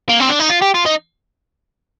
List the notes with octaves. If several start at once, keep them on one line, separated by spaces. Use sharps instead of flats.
A#3
C4
D4
D#4
F4
G4
F4
D#4